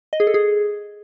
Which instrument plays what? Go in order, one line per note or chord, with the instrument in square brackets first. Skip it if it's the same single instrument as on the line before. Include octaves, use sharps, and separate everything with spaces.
[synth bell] D#5
G#4
A4
G#4